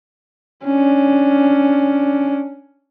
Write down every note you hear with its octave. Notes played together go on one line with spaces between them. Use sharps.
C#4 D4